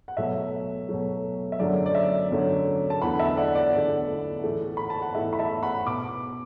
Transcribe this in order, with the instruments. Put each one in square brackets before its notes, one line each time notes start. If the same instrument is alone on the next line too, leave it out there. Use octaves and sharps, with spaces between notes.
[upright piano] F#5
B2 F#3 A3 E5
B2 F#3 A3
E5
F#2 D3 F#3 A3 D5
D5
E5
F#2 D3 F#3 A3
A5
E2 D3 A3 F#5 B5
E5 A5
D5 F#5
D5 F#5
E2 D3 A3
A2 E3 A3
B5
A5
F#5
A2 E3 A3 E5
B5
E5 A5
F#5 B5
B2 D6